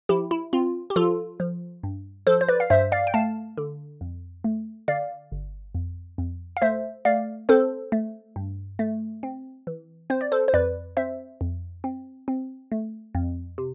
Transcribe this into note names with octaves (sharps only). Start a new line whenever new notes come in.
F3 E4 G4
E4
C4 F4
G4
F3 F4 A4
F3
G2
F3 A4 C5
C5
B4 D5
F5
G2 C5 E5
D5 F5
G5
A3 F5 A5
D3
F2
A3
D3 D5 F5
G1
F2
F2
F5
A3 C5 E5
A3 D5 F5
C4 A4 C5
A3
G2
A3
C4
E3
C4 C5
D5
A4 C5
C5
F2 B4 D5
C4 C5 E5
F2
C4
C4
A3
F2
C3